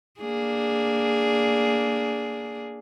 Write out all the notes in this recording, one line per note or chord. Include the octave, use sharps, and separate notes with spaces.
A#3 D4 G#4